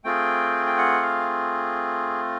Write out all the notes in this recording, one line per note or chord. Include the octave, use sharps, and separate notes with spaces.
A3 C4 F4 G#4 G5
G5
F#5
F5